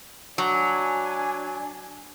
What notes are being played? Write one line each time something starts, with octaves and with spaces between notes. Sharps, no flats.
F#3 D4 D5 G#5